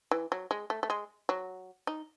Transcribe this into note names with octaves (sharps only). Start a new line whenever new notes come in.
E3
F#3
G#3
A3
A3
G#3
F#3
D#4